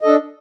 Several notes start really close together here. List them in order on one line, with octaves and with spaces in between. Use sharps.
D#5 A4 D4